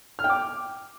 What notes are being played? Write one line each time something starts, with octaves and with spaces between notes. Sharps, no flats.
F6
G5
D6